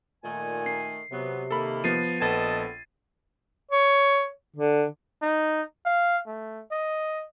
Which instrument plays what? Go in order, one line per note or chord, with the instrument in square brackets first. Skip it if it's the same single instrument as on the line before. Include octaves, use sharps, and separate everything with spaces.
[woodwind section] A#2 G#5 [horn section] D#3 A3
[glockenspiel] C7
[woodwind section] C3 [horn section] F#3 B3
[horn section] D#3 A#3 [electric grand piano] A4 B5
[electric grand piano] F3 B3 [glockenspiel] A6 C7 D#7
[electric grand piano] A#1 G#6 [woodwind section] B3 A4 [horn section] D#5 A5
[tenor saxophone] C#5
D3
[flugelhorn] D#4
F5
A3
D#5